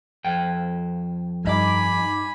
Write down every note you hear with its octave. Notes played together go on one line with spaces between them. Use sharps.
F2 G5
G2 D#4 G#5 B5 D6